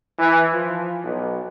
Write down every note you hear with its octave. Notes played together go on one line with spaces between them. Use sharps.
E3
F3
B1